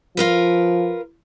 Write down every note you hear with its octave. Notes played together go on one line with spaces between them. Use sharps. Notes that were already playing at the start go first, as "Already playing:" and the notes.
F3 F4 A#4 B4